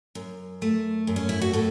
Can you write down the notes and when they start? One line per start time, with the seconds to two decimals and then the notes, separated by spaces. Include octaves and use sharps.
0.15 F#2
0.62 A3
1.07 F#2
1.16 C#4
1.29 E4
1.42 F#4
1.53 A2 A4